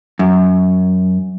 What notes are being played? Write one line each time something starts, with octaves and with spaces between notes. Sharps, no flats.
F#2